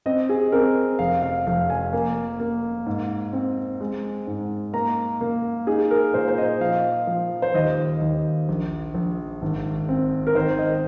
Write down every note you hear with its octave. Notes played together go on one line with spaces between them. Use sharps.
C4 D#5
G#4
C4 A#4
F1 F5
F5
F1 F5
G#5
A#3
A#3
G#2
C4
G#3
G#2
A#3 A#5
A#3
D#4 G#4
A#4
A#2 C5
C5
D#5
F3 F5
F3
C5
D#2 D#5
D#2
A#1
A#1
G#1
C4
A#4
D#3 C5
D#5